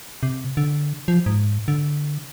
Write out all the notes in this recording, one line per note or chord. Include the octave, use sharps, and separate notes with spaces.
C3
D3
F3
G#2
D3